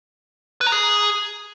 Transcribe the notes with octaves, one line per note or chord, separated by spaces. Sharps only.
B4
A#5
G#4